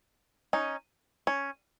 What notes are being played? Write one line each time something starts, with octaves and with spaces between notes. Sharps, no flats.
C#4 D#4
C#4